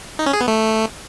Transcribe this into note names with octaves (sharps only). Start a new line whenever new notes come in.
D#4
C#4
G#4
B3
A3